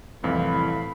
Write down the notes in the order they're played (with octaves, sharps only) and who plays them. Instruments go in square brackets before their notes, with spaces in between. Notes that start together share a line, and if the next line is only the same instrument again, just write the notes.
[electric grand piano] C2 F2 E3 [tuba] A2 [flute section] F5 B5